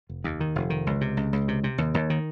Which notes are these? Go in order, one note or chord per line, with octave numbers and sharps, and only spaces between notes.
F1
D#2
D#3
F1
D#3
C#2
C3
C#2
C#2
C3
C3
D#2
D#2
D#3